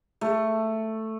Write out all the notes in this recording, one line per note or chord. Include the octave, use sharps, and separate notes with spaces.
A3